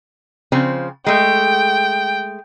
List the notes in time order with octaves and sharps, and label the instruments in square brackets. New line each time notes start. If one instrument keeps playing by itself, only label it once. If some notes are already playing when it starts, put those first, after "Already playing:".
[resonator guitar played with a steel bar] C#3 F3 C4
[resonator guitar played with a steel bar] G#3 A3 [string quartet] G5